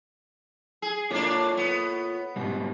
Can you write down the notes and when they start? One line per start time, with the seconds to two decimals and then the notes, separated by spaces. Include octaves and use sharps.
0.82 G#4
1.11 A#3 D4 F4 A4 C#5
1.57 B3
2.36 G#2 B2 G3